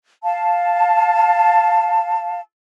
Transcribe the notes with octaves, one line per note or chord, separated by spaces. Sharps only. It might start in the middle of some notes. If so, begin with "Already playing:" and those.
F5 A5